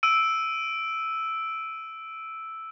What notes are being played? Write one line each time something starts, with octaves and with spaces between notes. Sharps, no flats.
E6 D7 D#7